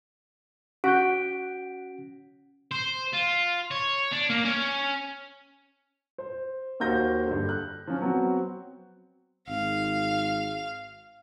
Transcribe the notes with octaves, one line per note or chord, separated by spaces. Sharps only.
C#4 F#4 F#5 G6 B6 D7
C5
F4
C#5
D4
A#3
C#4
C5
D#2 A#3 F#4 C5 G6 A#6
G2 D3
F#6
F3 C#4
F#3 B3 C4 F#4
G#1 F5